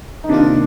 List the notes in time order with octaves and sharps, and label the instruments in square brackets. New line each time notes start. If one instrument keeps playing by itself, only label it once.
[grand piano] D#4
[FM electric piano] C3 D#3 A#3 F4 [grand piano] D4